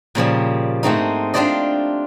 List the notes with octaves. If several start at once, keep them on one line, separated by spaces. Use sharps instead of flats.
A#2 C#3 F3 G3
G#2 A3 C4 D#4
D4 F4 G4 C5 D5 D#5